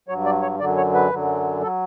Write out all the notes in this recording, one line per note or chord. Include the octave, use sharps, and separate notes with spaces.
G2 F#3 C#5
D5
C#5
F#2 D3 F#3 D5
C#5
B4
F#2 D3 F#3
F#3 A4